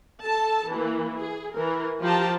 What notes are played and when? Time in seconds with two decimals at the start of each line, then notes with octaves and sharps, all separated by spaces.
0.23 A4 A5
0.70 E3 A#3
1.17 G#4
1.54 E3 A#4
2.01 F3 F4 G4 G5 A5 A#5